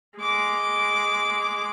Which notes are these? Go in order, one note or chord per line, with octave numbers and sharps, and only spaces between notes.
G#3 D6